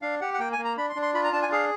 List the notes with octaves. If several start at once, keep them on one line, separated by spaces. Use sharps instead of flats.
D4 F5
G4 F#5
F#5
A#3 G5
G#5
A#3
A#5
D4 B5
C6
D4
C6
F4 B5
A#5
D4 A5
G#5
G#4 F5